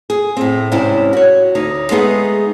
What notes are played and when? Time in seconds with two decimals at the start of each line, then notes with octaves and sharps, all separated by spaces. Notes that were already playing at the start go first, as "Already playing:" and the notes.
0.10 G#4
0.37 A2 C4
0.72 G#2 C3 C#4 D4 E4
1.13 F#4 C#5
1.55 D2 D#4
1.91 G#3 A3 B3 D#4 G#4